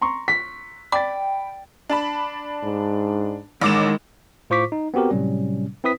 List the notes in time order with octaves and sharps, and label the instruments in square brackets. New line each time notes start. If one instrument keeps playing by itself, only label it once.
[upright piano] A#5 C6 C#6
[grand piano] B6
[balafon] D5 D6 [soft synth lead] G5 [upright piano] B5 A6
[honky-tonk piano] D4 A5 B5
[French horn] G#2
[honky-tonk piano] A1 D6 E7 [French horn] D#3 [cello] G#3
[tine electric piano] A2 F4 C5 C#6 D6 B6
D#4
B3 C4 F#4 G4 A#4
A2 C3 F#3 G3 C#4
C4 E4 B4 D#6 B6